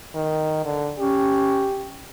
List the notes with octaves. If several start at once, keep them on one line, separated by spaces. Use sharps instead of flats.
D#3
D3
C#4 G4